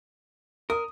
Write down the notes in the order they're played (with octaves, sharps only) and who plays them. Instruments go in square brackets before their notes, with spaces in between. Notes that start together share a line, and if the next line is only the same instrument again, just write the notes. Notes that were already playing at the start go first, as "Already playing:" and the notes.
[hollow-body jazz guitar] A#4 [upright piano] D#6